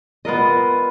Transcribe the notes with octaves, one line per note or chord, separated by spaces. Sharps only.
B3 F4 A#4 D#5